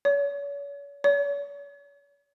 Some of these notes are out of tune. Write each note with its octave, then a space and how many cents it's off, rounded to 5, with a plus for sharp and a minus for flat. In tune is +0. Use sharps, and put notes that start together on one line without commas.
C#5 +40
C#5 +45